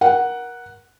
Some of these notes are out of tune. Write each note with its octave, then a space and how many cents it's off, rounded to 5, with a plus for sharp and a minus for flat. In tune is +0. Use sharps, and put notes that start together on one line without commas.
A#4 +25 F#5 +0